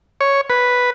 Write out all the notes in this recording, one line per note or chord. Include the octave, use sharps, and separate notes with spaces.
C#5
B4